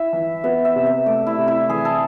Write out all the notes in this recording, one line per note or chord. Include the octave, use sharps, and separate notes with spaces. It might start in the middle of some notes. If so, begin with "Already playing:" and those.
Already playing: E4 E5
E3
B3 E5
E5
C3
E5
A3 D5
E4
C3
E4
E3 G#4
A4